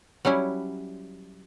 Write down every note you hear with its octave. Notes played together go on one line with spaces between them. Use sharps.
F#3 G3 C#4 E4